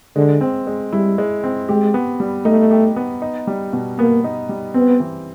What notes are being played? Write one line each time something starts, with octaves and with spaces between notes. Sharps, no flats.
D3 G#3
C4
G#3
G3 E4
G#3
C4
G#3 G4
B3
G3
A3 D#4
G4
B3
D#4
G3
B2
A#3 B3
D#4
G3
B3 C4
E3